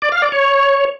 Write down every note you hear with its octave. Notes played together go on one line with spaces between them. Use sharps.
D5
F5
D5
C#5